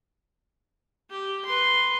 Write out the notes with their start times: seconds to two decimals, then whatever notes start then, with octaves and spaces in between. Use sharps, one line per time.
1.10 G4
1.45 B4 C6